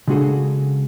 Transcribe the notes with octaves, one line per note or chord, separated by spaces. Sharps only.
C#3 G#3 D4 F#4 G#4 A4